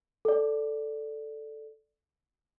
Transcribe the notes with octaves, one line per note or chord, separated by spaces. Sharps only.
A4 D5